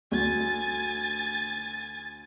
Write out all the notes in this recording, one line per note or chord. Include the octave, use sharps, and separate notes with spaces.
D2 G#5 A6